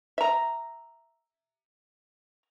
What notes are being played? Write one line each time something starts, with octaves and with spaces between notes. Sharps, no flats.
E5 A#5